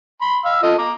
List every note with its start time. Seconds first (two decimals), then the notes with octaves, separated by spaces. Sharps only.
0.22 B5 C6
0.45 F5 E6
0.63 F4 A4 D#5
0.78 A#5 D6